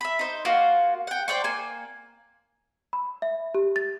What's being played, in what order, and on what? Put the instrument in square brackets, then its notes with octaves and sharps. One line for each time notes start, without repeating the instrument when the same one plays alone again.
[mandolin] E5 B5
D#4 C5
A#3 F4 F#4 F5
F#5 G5
C5 D5 G5 C#6
A#3 G#5
[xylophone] B5
E5
G4
A6